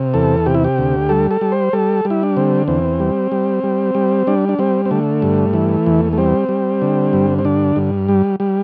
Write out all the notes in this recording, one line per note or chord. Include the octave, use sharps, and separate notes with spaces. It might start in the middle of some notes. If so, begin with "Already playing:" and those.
Already playing: C3
E2 A4
C3 G4
E4
G4
D2
G3 A4
A4
G3
C5
G3 A4
G3
E4
D4
D3 C4
E2 C4
G3
G3
G3
G3
G3 D4
D4
G3 C4
C4
D3 A3
G2
E3
E2
A3
G3 C4
G3
D3
G2
C4
D3 D4
G2
G3
G3